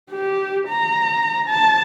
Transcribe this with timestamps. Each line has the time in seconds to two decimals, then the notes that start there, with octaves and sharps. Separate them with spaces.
0.10 G4
0.68 A#5
1.49 A5